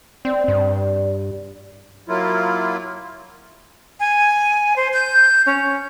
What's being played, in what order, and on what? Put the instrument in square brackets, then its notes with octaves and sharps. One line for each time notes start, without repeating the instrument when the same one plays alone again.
[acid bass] C4 [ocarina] D5
[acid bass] G2
[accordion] F#3 A#3 E4 F4
[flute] G#5
C5
G6
C#4